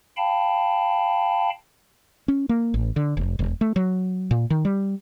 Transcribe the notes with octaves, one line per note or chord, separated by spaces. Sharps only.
F5 G5 A5 B5
C#4
A#3
A1
D3
F1
E1
A3
F#3
A#2
D#3
G3